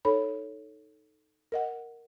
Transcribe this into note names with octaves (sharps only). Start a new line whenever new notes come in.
D#4 A4 C#5 B5
A#4 D#5 F#5